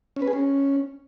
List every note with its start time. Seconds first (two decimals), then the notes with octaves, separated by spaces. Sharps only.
0.16 C#4
0.22 B4
0.28 G#4
0.33 C#4